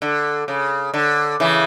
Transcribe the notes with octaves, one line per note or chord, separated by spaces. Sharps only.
D3
C#3
D3
C#3 E3